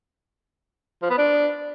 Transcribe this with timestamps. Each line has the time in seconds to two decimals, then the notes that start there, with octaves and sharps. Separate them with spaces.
1.02 F3
1.10 B3
1.18 D4